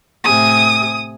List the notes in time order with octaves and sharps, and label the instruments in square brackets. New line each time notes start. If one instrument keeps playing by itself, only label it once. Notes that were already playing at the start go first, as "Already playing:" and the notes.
[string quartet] A2 C3 G#5 [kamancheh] D#6